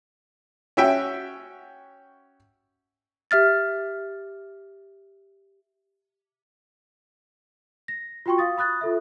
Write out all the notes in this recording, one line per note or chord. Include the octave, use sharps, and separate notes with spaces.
C#4 F#4 E5 G5
G4 E5 F6 A6
A#6
F4 F#4 G5 C6 C#6
F5 D#6 A6
B5 D#6 F#6 A6
F4 A4 E5